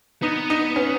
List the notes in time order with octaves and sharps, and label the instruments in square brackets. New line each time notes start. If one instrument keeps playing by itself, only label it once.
[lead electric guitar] B3 [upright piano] D#4
[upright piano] D#4
C#4